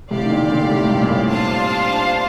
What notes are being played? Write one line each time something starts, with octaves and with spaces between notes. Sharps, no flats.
A2 C3 G4 D5 F5
D#3
A#2 D3
A#2 D3
A2 C3
G2 A#2
A#2
A2
D4 F4 C5 F5 A5